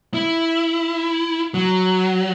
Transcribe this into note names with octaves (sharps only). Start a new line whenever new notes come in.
E4
F#3